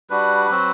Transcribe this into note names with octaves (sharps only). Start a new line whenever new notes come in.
G3 D4 F#4 B4
F#3 C4 F#4